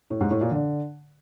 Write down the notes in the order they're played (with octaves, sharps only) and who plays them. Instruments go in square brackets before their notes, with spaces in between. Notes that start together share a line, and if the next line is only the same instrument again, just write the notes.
[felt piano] A2
G#2
A2
A#2
D3